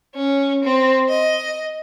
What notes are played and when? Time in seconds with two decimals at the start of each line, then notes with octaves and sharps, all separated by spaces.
0.15 C#4
0.64 C4
1.09 D#5